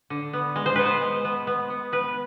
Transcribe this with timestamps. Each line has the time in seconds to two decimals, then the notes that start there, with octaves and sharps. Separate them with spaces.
0.10 D3
0.33 B3
0.56 G#3
0.66 C5
0.76 B3 B4
0.85 C5
1.01 G#3
1.25 B3
1.47 B3
1.70 B3
1.92 B3 B4